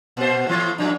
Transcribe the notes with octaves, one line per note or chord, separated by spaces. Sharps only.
A#2 C5
A2 E3
A2 F3 D4